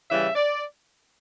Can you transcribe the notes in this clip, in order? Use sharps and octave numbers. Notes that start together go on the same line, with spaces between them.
C#3 E3 G3 E5
D5